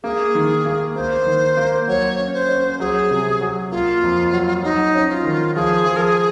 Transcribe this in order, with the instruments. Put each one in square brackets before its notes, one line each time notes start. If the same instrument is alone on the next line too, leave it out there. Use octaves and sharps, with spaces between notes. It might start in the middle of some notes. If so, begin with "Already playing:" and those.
[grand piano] A#3 [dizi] G#4
[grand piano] D#3
A#3
[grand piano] A#3 [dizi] C5
[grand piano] D#3
A#3
[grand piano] F#3 [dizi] C#5
[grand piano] C#4
[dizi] C5
[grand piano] C#4
[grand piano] F#3 [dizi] G#4
[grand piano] C3
F#3
[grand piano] A#3 [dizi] F4
[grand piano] F2
F#3
[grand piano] F#3 [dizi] D#4
[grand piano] C#4
[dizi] F4
[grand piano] D#3
[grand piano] F3 [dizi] G#4
[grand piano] F3
[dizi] A#4
G#4